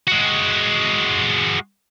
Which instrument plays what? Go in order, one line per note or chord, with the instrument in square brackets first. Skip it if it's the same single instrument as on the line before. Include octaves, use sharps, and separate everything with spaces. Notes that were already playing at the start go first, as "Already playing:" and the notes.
[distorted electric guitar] G#3 F#4